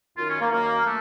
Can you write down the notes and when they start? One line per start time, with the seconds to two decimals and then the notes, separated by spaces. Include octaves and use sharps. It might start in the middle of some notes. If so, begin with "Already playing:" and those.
0.17 F#2 D#3 F4
0.29 C#4
0.40 A#3
0.51 F#2 D#3 A#3
0.86 A3